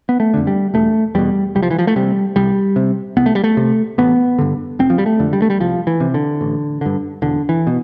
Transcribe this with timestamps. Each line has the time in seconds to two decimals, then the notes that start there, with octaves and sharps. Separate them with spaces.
0.09 B3
0.20 A3
0.34 F2 D3
0.47 G3
0.74 E1 A3
1.15 E2 B2 G3
1.55 C2 G3
1.63 F3
1.70 E3
1.78 F3
1.87 A3
1.96 C3 G3
2.36 C2 G3
2.76 C3
3.17 C2 B3
3.26 A3
3.35 G3
3.44 A3
3.57 C3
3.98 A1 B3
4.38 G2 D3
4.79 F1 C4
4.90 F3
4.98 G3
5.06 A3
5.19 F2 D3
5.33 G3
5.42 A3
5.50 G3
5.60 C2 F3
5.87 E3
6.00 C3
6.14 D3
6.41 A1
6.81 G2 D3
7.22 E1 D3
7.49 E3
7.67 B2